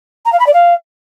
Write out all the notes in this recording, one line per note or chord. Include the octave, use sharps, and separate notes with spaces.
A#5
F5
B5
D5
F5